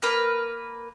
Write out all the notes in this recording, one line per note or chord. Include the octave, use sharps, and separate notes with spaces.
A#3 A#4 B4